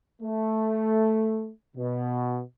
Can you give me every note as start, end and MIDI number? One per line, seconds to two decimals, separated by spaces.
0.22 1.50 57
1.76 2.41 47